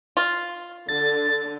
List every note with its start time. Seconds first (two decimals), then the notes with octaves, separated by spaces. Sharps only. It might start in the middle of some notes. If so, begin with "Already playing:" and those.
0.17 F4
0.89 D3 A6